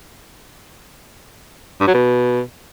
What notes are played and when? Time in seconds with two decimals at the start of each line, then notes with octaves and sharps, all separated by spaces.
1.81 G2
1.87 F#3
1.94 B2